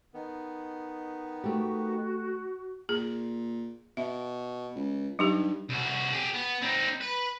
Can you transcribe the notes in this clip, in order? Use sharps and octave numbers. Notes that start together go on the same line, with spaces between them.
D#3 B3
A3 F#4 G4
A#2 G#4
B2 E5
C#2
G2 F#3 D#4 G4
C2 F#4
G4 G#4
B3
C4 D#4
B4